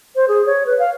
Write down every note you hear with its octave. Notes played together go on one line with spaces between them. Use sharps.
C5
G#4
C#5
B4
F5